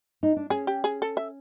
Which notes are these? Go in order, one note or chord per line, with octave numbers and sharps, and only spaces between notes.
D#4
D4
C#4 G#4
G4
G#4
A4
E5